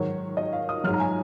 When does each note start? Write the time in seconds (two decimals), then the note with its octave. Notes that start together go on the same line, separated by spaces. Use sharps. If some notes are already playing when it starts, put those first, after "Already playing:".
Already playing: G#2 D#3 F#3 C#5
0.37 D#5
0.53 F5
0.69 D#6
0.84 F#3 F6
0.87 G#2
0.94 A#5
1.00 G#5